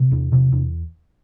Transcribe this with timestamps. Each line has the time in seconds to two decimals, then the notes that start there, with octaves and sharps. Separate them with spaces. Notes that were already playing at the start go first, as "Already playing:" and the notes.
Already playing: C3
0.11 E2
0.32 C3
0.52 E2